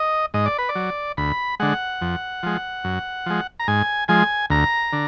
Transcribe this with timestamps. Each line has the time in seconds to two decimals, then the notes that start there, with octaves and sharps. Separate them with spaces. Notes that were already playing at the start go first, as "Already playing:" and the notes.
Already playing: D#5
0.34 G#2 D#5
0.46 D5
0.58 B4
0.69 D5
0.75 F#3
1.17 D2 B5
1.60 D3 G#3 F#5
2.01 F2
2.43 F3 G#3
2.84 F#2
3.26 F3 G#3
3.59 A#5
3.68 G#2 G#5
4.08 F3 G#3 G#5
4.50 D2 A#5
4.93 D3